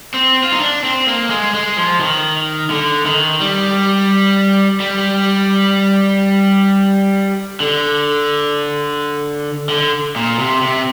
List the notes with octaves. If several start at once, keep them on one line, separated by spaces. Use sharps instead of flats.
C4
F4
D#4
D4
C4
A#3
G#3
G#3
F3
D#3
D3
D#3
G3
G3
D3
D3
A#2
C3
C3